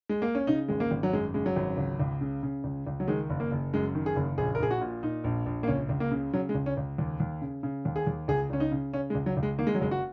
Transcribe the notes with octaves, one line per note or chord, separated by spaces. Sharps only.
G#3
A#3
C#4
C#3 D#4
G#1 G#3
A#3
G#1
F#3
F#2 G#3
C#3 G#3
F#3
G#1
C#2
C#2
C#3
C#3
C#2
C#2
F#3
D#3 G#3
F#1
A#3
F#1
F#2 G#3
D#3
G#4
F#1
A#1 G#4
A#4
A#1 G#4
F#4
A#2
A#2 D#4
A#1
A#1
A#3
C#2 C#4
C#2
A#3
C#3
C#3 F#3
G#3
C#2
C#4
C#2
D#2
D#2
C#3
C#3
D#2
G#4
D#2
C#2 G#4
C#2 C#4
D#4
C#3
C#3 C#4
G#3
C#2
F#3
C#2
G#3
D#3 A#3
G#3
F#3
F#1 G#3
F#4